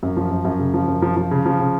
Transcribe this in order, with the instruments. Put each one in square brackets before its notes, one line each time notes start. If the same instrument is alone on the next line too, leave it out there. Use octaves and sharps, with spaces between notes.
[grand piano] F#2
F3
F#2
F#2
C#3
F3
F#2
F3
F3
C#3
F3
C#3